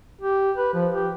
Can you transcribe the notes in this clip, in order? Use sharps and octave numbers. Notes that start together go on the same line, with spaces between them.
G4
B4
F3
G4